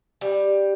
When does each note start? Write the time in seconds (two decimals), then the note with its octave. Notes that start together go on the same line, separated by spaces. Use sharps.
0.21 G3